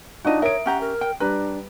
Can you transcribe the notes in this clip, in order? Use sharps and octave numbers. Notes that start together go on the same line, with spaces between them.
D4 D#4 F4 F#4 D#5
A#4 C#5 E5 D#6 D7
C#4 G4 F#5 A#5
A#4
G5
G3 D4 B4 A#5 F#6